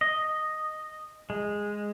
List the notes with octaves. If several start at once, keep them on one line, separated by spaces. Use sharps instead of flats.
D#5
G#3